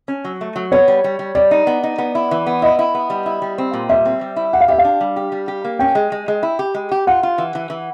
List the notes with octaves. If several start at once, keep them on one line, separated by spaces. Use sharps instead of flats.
C#4
F#3
A3
F#3
B3 C#5
G3
G3
G3
G3 D5
D#4
B3
D#4
B3
E4
E3
B3
E4 D#5
E4
B3
G3
E4
G3
C4
A#2
G3 E5
C4
G3
E4
G4 F#5
F5
G4 E5
F5
D4
G3
G4
G3
G4
A#3
C#4 G5
G#3
G#3
G#3
E4
G4
G#3
G4
F4 F#5
F4
E3
E3
E3